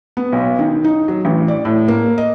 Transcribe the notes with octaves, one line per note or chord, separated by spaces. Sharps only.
B3
B1
D#3
D#4
F#3
A1
D5
A2
A#3
D#5